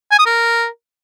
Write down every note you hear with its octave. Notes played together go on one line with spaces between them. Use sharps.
G#5
D#6
A#4